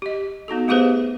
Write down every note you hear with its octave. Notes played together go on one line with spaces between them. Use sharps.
G4 D#5
B3 D#4 F#4 A4
A3 B3 G4 G#4 B4 C5